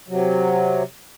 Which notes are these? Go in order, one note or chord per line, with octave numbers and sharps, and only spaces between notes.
C3 F#3